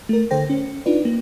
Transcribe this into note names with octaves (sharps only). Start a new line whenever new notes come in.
A3 A#4
G#1 D3 A4 C5 G5 A#6
C#4
D4 D#4 F4 B4 D5
A#3